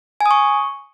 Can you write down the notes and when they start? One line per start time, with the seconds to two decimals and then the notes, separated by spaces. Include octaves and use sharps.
0.21 G#5
0.26 D#6
0.31 C#6